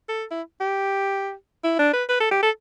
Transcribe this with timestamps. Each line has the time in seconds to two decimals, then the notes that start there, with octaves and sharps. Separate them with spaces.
0.09 A4
0.31 E4
0.61 G4
1.64 E4
1.79 D4
1.93 B4
2.09 B4
2.20 A4
2.31 G4
2.43 A4